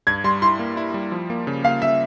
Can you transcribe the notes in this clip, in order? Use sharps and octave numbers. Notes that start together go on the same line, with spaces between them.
G2 G#6
G3 C6
E4 C6
A#3
E4
G3
F3
A#3
C#3
A#3 F5
C#3 E5